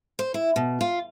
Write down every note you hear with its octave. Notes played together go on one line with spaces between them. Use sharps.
C5
E4
B2
F4